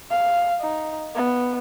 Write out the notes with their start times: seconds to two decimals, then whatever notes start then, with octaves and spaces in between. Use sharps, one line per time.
0.11 F5
0.61 D#4
1.15 B3